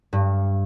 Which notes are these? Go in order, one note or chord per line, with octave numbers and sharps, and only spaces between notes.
G2